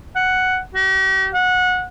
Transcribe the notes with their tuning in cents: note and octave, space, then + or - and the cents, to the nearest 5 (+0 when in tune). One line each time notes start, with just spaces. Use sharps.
F#5 +5
G4 -45
F#5 -20